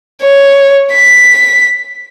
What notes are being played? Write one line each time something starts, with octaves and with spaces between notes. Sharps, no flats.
C#5
B6